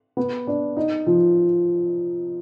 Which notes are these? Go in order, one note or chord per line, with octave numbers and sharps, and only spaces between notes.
B3
D4
D#4
F3